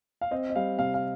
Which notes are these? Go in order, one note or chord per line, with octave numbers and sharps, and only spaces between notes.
F5
C4 D#5
D#5
G3 F5
C3 F5
F5